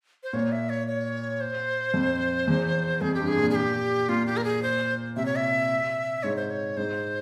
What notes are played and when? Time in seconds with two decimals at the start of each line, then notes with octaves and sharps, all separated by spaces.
0.23 C5
0.33 A#2 C#5
0.52 E5
0.70 C#5
0.88 C#5
1.41 C5
1.94 F2
2.47 E2
3.01 F2 G#4
3.14 G4
3.19 G2
3.27 G#4
3.38 A#2
3.50 G#4
3.55 G4
4.09 A#2 F4
4.26 G4
4.37 A#4
4.44 G#4
4.63 C5
5.16 C3 E5
5.26 C#5
5.37 E5
6.23 G#2 C#5
6.36 C5
6.50 C#5
6.77 G#2 C5